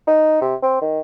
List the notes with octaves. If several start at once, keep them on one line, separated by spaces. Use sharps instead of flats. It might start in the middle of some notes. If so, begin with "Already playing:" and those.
D#4
C3
C4
D#3